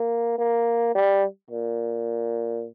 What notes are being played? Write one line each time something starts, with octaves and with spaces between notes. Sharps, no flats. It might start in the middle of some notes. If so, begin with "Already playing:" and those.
Already playing: A#3
A#3
G3
A#2